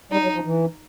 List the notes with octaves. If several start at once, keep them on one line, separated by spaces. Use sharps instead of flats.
G3 D#4
F#3
F3
E3